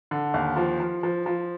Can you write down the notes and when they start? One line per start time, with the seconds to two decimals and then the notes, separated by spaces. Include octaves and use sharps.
0.11 D3
0.34 D#2
0.56 F3
0.80 F3
1.03 F3
1.26 F3